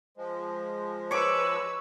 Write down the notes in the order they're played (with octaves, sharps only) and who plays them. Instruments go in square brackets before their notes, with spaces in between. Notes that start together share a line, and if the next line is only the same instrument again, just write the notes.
[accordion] F3 G#3
[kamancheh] B4 E6 [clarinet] C#5 [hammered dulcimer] C#6 D6